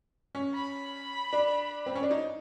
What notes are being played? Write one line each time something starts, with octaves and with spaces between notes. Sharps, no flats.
C#4
B5
D4
C4
C#4
D4
D#4